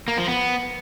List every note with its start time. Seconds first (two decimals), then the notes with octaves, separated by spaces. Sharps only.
0.08 A#3
0.18 F3
0.28 B3